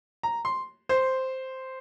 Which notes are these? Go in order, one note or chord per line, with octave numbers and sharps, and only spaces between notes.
A#5
C6
C5